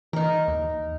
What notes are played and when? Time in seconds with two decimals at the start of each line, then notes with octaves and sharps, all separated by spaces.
0.13 E3 D#4 A#4
0.48 D#2